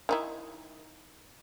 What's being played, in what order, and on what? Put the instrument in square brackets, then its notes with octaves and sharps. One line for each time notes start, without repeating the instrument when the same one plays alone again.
[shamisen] D#3 D#4 E4